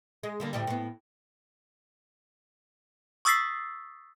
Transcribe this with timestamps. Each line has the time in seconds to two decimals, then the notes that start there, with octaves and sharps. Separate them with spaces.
0.23 G#3
0.40 D3 G3 A#3
0.53 D2 A2 G3
0.67 A2 B3
3.25 C#6 D#6 E6 A6 B6 C7